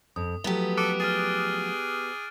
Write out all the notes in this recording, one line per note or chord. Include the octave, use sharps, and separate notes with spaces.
F2 D#6
F3 F#3 A3 B3 G4
A4 D6 F#6 D7
G#4 F6 A6